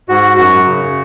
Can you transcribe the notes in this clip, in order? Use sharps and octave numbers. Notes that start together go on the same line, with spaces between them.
G#2 F#4
F#2 F#4
C#3